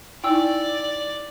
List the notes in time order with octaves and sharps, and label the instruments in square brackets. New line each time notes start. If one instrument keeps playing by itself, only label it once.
[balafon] D#4 E4 G#5 [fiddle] D5 [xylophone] G5 E6